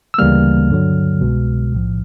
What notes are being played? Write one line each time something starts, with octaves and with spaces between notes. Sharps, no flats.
E6
D2 C#3 E3 G3 A#3 F6
G2 D3 F#3
C2 B2 G#3
B1 A2 F3